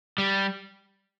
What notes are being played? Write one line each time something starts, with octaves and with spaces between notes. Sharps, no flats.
G3